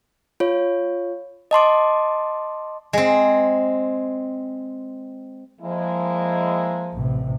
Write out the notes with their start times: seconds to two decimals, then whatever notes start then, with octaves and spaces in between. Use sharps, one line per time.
0.40 F4 C#5
1.51 D#5 A5 C6 D6
2.93 G#3 C4
5.60 F3 G#3 A#3 E4
6.93 A1 C3